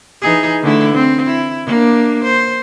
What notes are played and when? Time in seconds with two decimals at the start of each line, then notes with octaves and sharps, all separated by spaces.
0.22 E3 D#4 G#4
0.63 D3 A3 E4
0.94 C4
1.27 E4
1.66 A#3 D4
2.24 C5